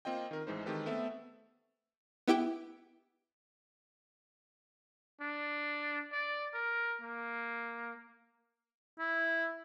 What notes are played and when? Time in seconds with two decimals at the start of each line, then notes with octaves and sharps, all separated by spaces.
0.05 A#3 C4 F4 D#5 G5
0.31 D#3 A#4
0.47 A1 E3 G#3 D#4 C5
0.66 D#3 G#3 C4 G4 A4 B4
0.86 A3 B3 C4 A4 E5
2.28 B3 E4 G4 G5
5.21 D4
6.12 D5
6.54 A#4
7.01 A#3
8.99 E4